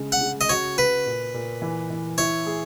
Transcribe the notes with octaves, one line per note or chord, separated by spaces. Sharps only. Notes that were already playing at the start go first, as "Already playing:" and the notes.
Already playing: C#3 G#3
F#5
C#3
D#5
F#4 C#5
F#4 B4
A#2
A#2
E3
E3
E4 C#5
G#4